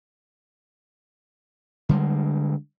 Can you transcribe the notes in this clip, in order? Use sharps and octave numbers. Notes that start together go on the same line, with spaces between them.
D3 G3 G#3